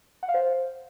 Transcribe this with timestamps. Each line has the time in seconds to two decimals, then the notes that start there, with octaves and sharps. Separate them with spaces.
0.23 F#5
0.29 F5
0.34 C5